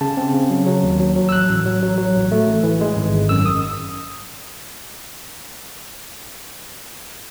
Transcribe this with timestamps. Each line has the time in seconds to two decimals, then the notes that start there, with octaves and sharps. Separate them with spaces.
0.01 C#3 A5
0.17 C4
0.34 C#3
0.50 F#3
0.66 F#3
0.83 D#2
1.00 F#3
1.16 F#3
1.29 E6
1.32 A1 F#6
1.49 A1
1.65 F#3
1.82 F#3
1.98 F#3
2.15 A1
2.32 A3
2.48 A1
2.63 E3
2.81 G#3
2.96 G#1
3.14 G#1
3.29 F#2 E6
3.46 D#6